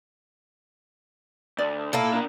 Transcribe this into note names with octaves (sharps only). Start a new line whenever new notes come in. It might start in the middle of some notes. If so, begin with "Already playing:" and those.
D2 D5
A#2 A#3 E4 A4
D4 A#4